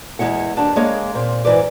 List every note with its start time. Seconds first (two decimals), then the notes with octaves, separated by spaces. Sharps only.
0.19 E2 F#3 G#3 E4 F#5
0.57 D#2 D4
0.76 G#3 A#3 G#4 C#5 F5
1.15 A#2 C4
1.45 G#2 E3 B4 D5